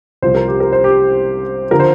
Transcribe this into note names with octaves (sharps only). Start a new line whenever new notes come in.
C2 C3 F3 C5
A#4
G4
A#4
C5
G4
D3 F3 A#4
C5